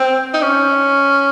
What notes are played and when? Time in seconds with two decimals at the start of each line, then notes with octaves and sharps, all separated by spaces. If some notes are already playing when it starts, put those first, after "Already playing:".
Already playing: C4
0.34 D#4
0.42 C#4